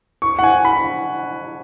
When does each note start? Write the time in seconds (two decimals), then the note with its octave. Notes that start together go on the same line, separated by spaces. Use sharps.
0.22 C#6
0.39 F#5
0.43 G#5
0.65 B5